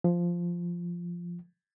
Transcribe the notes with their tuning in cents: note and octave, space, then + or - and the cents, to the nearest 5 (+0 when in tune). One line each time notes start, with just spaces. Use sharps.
F3 -5